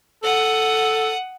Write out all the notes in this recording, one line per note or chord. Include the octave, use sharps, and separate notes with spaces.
A4 F#5 D#6